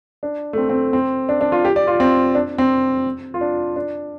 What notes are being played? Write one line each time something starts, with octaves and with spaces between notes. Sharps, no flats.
D4
A3
C4
C4
C4
D4
D4
F4
G4
D5
F4
C4
D4
C4
F4
D4
D4